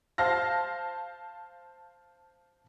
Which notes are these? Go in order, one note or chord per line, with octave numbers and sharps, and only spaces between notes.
C5 F5 A5 F6 A#6